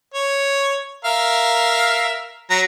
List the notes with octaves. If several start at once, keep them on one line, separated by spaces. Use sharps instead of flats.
C#5
A#4 E5 F5
F#3 A#5